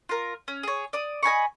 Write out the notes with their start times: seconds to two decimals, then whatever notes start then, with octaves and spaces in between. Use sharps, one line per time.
0.09 F4 A#4
0.48 C#4
0.63 G#4 C#5
0.93 D5 D#6
1.23 D#5 G#5 B5 C#6